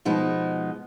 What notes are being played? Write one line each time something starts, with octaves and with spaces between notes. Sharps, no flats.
B2 F3 G#3 D#4